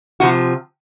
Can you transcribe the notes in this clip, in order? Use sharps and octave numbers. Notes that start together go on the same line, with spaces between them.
C3 F3 F#4